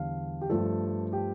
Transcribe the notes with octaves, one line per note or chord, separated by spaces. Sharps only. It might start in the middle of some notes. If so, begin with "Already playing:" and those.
Already playing: E2 D3 G3 F5
G4
G2 F3 A3 A4
G4